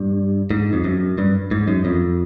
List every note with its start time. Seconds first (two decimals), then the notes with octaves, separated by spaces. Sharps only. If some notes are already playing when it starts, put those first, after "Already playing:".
Already playing: G2
0.51 G#2
0.73 F2
0.84 F#2
1.18 G2
1.51 G#2
1.68 F#2
1.85 F2